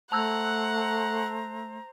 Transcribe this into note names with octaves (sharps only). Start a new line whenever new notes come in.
A3 C5 F#5 A5 A#5 E6 F#6